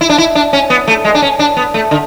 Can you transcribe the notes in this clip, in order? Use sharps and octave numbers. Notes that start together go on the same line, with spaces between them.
E4
D4
E4
D4
C#4
B3
A3
G#3
D4
C#4
D4
B3
A3
D3